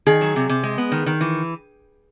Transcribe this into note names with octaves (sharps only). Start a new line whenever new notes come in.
D#3 G#4
F#3
C3
C3
G#3
B3
D#3
D#3
E3